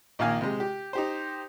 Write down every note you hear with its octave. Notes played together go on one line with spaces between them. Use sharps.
A#1 D#3 A#3 F5 G#5
C3 G#3
G4
D#4 G4 C5